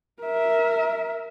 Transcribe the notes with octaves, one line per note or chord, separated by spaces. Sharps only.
A#4 E5